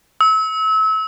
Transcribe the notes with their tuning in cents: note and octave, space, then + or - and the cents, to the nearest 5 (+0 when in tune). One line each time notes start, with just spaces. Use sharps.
E6 -30